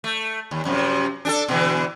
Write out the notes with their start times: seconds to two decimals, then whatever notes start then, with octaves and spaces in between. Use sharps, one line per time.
0.04 A3
0.51 D#2
0.65 F#2 C3 F3
1.25 D4 G#4 A4
1.48 B2 D3 E3